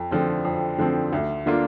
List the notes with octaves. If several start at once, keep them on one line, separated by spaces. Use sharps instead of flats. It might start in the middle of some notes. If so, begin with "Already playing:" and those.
Already playing: F2
D3 F3 C4
F2
D3 F3 C4
D2
D3 A#3 D4 F4